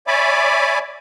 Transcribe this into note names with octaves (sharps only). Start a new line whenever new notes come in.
C#5 D5 E5 G#5 B5 D6